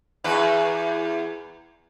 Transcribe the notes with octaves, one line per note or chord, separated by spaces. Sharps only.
E2 B4